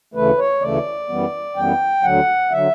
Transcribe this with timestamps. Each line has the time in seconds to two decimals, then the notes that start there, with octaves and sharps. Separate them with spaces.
0.14 D2 C#3 E3 A3 B4
0.38 C#5
0.62 D2 C#3 E3 A3 D5
1.09 F#2 E3 G3 B3
1.56 F#2 E3 G3 B3 G5
2.03 D2 D3 F#3 F#5
2.52 D3 F#3 E5